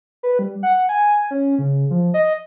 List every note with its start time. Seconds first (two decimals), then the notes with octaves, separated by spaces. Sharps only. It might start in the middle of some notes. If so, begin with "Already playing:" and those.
0.23 B4
0.39 G3
0.63 F#5
0.89 G#5
1.31 C#4
1.59 C#3
1.91 F3
2.14 D#5